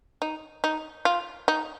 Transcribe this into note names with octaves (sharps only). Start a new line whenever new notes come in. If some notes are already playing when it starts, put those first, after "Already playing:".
D#4
D#4
F4
D#4